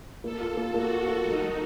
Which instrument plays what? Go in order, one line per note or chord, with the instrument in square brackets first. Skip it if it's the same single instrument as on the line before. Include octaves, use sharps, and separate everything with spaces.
[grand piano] A#3 [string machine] A4
[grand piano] F4
A#3
[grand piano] A#3 [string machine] F#4
[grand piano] F4
A#3
[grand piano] F#3 [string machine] D#4
[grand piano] F#3